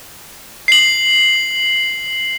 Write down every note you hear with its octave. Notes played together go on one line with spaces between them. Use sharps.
C7 F#7